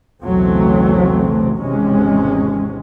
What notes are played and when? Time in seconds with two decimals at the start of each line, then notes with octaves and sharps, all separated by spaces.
0.23 B1 E2 C#3 F#3 A3 C4
1.57 G#1 E2 C3 G#3 C#4